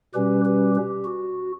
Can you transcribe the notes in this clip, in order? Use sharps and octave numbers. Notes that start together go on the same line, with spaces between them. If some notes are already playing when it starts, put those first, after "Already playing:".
B2 G3 C#4 G4 B4
G4 B4
G4
F#4